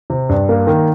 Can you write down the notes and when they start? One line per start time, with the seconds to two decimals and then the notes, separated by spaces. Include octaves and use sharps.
0.10 C3
0.29 G2
0.49 A#3
0.67 D#3